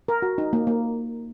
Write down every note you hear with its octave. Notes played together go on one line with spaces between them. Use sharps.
A#4
F#4
D#4
A#3
A#3